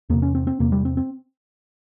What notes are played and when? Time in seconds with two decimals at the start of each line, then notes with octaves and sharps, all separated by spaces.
0.10 E2 C3 A#3
0.22 C#4
0.35 C4
0.47 C4
0.60 E2 C3 A#3
0.72 G3
0.85 C4
0.97 C4